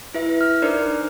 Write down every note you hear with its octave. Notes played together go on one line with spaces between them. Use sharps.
E4 B4 E5
F6
D4 D#4 A#4 C5 D5